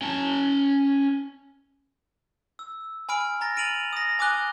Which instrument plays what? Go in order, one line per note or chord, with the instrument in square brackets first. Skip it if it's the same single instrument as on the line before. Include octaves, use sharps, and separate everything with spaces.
[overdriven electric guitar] C#4 A5
[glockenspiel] E6
G#5 B5 F6 D7
A#5 A6 A#6
F6 A6 D7 D#7 F7 F#7
D#6 A#6
G#5 D6 D#6 F#6 G7